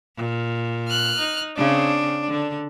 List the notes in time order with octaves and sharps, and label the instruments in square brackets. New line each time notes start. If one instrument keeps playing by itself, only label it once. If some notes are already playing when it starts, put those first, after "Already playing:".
[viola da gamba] A#2
[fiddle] F6 F#6
[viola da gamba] D#4
[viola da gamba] C#3 C4 [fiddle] D4
[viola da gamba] D3 D4